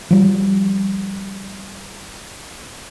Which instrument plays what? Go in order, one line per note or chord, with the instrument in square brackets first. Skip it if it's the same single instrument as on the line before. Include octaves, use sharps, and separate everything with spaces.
[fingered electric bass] F3 G3